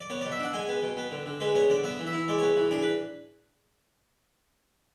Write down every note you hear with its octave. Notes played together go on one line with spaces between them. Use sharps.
D5
B3 C#5
B2 D5
E5
D4 F#5
G#3 G#5
B3
B2
B3
D3
D3
G#3 B4
B3 C#5
D3 D5
B3 E5
E3
E5
E4
G#3 D5
B3 C#5
E3
D4 G#4
B4